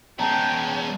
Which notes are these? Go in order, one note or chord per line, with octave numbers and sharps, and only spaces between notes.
G#3 B3 C#4 G5 A5 A#5